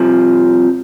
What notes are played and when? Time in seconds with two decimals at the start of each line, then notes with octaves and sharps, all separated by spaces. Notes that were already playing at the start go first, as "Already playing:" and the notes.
Already playing: C2 C3 F3